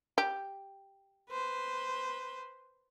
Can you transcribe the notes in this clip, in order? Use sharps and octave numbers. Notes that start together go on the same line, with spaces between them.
G4
B4 C5